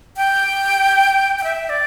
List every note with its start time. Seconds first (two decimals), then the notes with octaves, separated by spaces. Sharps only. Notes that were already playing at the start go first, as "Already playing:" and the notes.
0.17 G5
1.39 G5
1.44 E5
1.69 D5